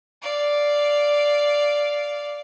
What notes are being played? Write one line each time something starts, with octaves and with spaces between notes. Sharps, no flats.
D5 F5